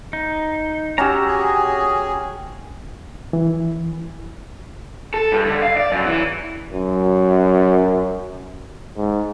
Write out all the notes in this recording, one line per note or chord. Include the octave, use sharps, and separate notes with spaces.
D#4
C#4 F#4 G4 A#5 E6
G#4
E3
A4
G2
D3
F5
D5
F#2
E3
F#2
G#2